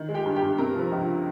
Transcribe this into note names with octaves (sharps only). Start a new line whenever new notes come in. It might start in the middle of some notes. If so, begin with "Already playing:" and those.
Already playing: D#3
G#3
G4 G5
G2
G4 G5
G2
C3 A#4 A#5
F3
C#2